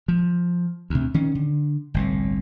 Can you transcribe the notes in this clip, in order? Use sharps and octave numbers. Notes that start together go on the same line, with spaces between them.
F3
D2 C3
D#3 C#4
D3
G1 C2 A2